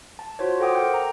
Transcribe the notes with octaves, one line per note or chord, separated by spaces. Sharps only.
A5
F4 F#4 C5 C#5
A4 C5 F#5 G5 D6 D#6
A4 A#4 G5 G6
G5 A#5